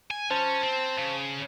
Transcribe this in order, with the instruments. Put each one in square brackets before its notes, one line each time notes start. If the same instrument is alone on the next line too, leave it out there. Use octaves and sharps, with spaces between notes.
[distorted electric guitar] G#5
[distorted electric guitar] C#4 [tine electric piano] C5 A5
[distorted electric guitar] C4
C#3